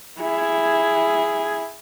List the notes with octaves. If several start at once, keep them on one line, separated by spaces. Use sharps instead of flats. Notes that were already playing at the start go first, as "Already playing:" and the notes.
E4 G#4